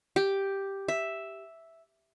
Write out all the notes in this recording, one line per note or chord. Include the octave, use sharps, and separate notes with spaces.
G4
E5